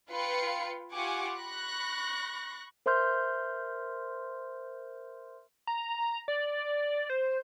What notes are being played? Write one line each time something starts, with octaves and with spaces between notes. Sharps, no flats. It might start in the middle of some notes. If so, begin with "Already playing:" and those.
F4 B4 F5 G5 B5 C#7
F4 G4 F#5 G#5 C#6 D6
B5 C#6 F#6 A#6
A#4 C5 E5 C6 F6 G6
A#5
D5
C5